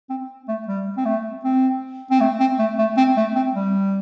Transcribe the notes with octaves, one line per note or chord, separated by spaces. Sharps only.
C4
A3
G3
C4
A3
C4
C4
A3
C4
A3
A3
C4
A3
C4
G3